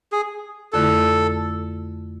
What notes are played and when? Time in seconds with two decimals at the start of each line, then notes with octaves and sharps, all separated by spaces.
0.12 G#4
0.73 F2 D3 A3 E4 A4